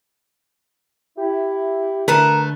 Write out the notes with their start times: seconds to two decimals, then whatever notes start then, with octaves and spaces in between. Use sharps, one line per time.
1.17 E4 G4
2.08 D3 A3 A#4 B4 A5